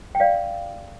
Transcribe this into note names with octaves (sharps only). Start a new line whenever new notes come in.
G5
D5 F5